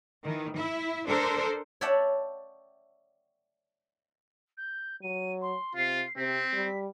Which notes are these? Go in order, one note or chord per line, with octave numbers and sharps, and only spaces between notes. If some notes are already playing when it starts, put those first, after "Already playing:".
D#3 E3
E4 E5
D4 A4 A#4 C5
C#5 D5 E5 F#5 G5 A5
G6
F#3 D#7
C6
C3 F4 C7
C3 C4 B6
G3